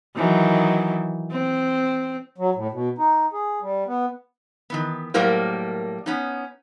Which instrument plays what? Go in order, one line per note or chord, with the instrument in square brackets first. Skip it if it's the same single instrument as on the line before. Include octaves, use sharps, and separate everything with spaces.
[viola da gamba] D#3 E3 F#3
C4
[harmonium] F#3
A2
B2
D#4
G#4
G3
B3
[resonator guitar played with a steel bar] D#3 E3 B3
A2 F#3 G3 A#3 A#4 C5
B3 C#4 D#4